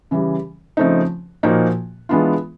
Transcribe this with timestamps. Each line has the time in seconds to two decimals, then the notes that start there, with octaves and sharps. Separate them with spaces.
0.11 C#3 E3 G3
0.77 C#3 F3 A3 C4 D#4
1.43 A#2 F3 A#3 D#4 F#4
2.09 E3 G#3 B3 D4 F4